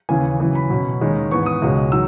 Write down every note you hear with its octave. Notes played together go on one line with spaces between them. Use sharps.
D#2 C#3 E3 G#5
F#2 C#3 E3
B5
B2 F#3 C#4
D#2 D#3 G#3 C#4
G#2 E3 B3 C#6
D#6
C#2 B2 G#3 C#4
D#3 F#3 E6